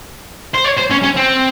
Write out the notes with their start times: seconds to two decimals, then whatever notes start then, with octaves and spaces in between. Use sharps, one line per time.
0.54 C5
0.65 C#5
0.78 C5
0.91 C#4
1.03 C#4
1.17 C4